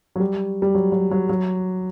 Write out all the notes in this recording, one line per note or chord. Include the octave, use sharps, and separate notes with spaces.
F#3
G3
G3
F#3
F#3
F#3
F#3